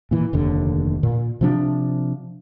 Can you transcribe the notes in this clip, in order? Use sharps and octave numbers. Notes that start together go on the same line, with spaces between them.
A#2 E3
F1 D#2 D3
A#2
C3 F3 D4